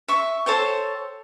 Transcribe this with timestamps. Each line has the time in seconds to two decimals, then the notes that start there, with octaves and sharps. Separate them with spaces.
0.08 E5 C#6
0.46 A4 C5 C#5 G5